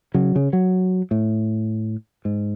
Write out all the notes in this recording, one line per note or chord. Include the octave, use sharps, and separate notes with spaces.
C#3 F#3
C#3
F#3
A2
G#2